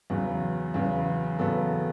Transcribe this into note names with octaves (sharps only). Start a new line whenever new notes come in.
E2 C#3 F#3 B3
E2 C#3 F#3 B3
E2 C#3 F#3 B3 A4